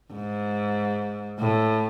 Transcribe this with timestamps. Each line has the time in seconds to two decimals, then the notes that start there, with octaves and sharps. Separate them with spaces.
0.14 G#2
1.39 A2